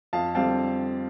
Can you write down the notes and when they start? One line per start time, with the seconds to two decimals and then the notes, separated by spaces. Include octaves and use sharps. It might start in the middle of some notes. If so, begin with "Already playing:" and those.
0.13 F2 F5 A5
0.35 D3 G3 C4 F5 A5